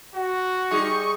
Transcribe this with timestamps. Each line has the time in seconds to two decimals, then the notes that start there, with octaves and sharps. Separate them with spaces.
0.14 F#4
0.71 G3 D#4 G#4 C#6